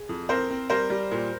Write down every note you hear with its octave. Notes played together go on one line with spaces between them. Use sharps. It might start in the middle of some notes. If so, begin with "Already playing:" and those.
Already playing: G#4
F2
C4 A#4 C5
C4
G3 A#4 C5
G3
A#2